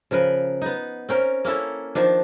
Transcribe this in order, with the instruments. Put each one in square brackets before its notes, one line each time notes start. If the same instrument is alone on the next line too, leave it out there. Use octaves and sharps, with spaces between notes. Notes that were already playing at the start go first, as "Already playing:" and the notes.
[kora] C#3 F3 A#4 B4
B3 D#4
C4 C#4 A#4
A#3 C#4 E4 A4
D#3 F3 D4